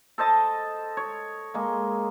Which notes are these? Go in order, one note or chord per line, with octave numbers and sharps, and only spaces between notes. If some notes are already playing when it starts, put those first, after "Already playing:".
A4 C5 D#5 A5
C#5
G#3 A#3